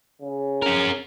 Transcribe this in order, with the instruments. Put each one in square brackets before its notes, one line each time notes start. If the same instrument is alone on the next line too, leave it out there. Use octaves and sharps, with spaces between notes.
[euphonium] C#3
[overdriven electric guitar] C#4 A#4